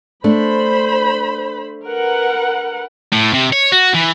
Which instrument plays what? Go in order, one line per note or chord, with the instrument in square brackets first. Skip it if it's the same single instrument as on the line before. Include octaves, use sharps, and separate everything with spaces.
[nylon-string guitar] A3 D4 [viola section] C5 B5
[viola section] A#4 B4 F#5
[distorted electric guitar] A2
C3
C#5
F#4
E3